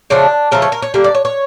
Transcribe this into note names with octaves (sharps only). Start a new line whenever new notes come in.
C#3 F3 A3 D4
C#3 F3 A3 A#4
C#5
A#4
C#5
D3 G3 A#3 A#4
D5
C#5
C#5